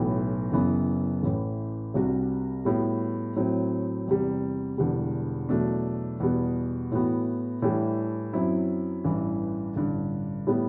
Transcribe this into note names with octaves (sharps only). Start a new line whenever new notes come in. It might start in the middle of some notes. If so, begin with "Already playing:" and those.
Already playing: B1 A2 E3 B3 F#4
F#1 F#2 E3 B3
A1 A2 E3
C2 C3 G3 D4 F#4
A2 G3 B3 F#4
A2 F#3 C4
E2 C3 G3
E1 E2 D3 G3
E2 B2 F#3 A3 D4
E2 B2 G3 B3
A2 E3 B3 F#4
A2 E3 G3 D4
F#2 F#3 C4 E4
A1 G2 E3
A1 G2 D3
A2 G3 B3